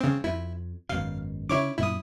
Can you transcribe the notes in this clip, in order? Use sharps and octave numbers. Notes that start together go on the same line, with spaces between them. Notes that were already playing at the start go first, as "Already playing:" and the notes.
C#3 C4
F2 E4
G#1 F#2 B2 F5
C#3 D4 E4 C#5 D6
F#2 A#2 E4 D#6